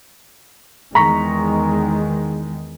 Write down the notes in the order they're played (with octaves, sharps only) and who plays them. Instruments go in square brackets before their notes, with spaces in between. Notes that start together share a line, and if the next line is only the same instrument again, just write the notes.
[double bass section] E2 D#3 G#3 [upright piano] A#5 C#6 B6